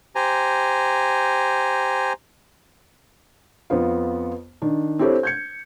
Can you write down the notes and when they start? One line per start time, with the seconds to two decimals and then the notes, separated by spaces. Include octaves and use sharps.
0.15 G4 C5 G#5 A#5
3.70 F2 B3 F4
4.62 D#3 D4
4.99 C4 E4 G4 A4 C5 C#5
5.23 G6 G#6 C#7